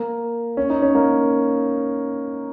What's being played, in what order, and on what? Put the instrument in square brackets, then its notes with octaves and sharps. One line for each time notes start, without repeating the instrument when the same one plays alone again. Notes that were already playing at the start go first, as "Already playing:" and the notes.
Already playing: [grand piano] A#3
C#4
D#4
C#4
A#3